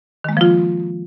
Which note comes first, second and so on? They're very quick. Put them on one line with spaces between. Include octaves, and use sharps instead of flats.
D#3 G#3 A#3 F3 F4